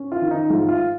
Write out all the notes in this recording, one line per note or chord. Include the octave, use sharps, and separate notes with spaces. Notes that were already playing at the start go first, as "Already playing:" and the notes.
Already playing: C#4
F4
D#3
D#4
G#2 F4
F4